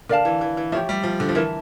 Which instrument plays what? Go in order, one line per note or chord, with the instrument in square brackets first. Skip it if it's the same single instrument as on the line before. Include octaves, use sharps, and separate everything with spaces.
[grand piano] D3 [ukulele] A#4 D5 F5 A5
[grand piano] E3
E3
E3
[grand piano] F3 [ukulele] G4 C#5 E5
[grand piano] G3
F3
D3
F3
[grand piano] E3 [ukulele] A#4 E5 A5